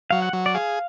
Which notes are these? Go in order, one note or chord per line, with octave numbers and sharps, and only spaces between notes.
F#3 F5
F#5
F#3
D5
G#4 F5